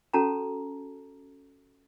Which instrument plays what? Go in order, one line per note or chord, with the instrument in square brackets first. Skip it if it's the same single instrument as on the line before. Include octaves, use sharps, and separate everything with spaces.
[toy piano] C#4 F#4 A4 A5 A#5